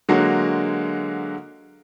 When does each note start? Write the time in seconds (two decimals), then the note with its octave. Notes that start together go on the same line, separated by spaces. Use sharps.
0.09 D3 F#3 G#3 A#3 F#4